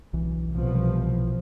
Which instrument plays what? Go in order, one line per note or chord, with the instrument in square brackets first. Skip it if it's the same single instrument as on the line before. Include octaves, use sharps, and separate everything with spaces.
[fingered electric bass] B1 E3
[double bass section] C2 B2 F3